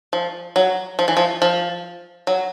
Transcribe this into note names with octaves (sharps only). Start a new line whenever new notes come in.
F3
F#3
F3
E3
F3
F3
F#3